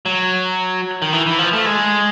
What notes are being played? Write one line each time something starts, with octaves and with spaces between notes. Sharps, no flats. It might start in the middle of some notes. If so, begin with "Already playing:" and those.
F#3
D#3
E3
E3
F3
A3
G#3